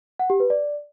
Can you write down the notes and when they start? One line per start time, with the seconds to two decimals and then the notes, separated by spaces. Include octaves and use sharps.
0.19 F#5
0.30 G4
0.40 B4
0.50 D5